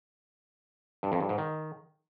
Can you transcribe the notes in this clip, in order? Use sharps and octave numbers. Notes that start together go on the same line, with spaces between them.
G2
F2
G2
G#2
D#3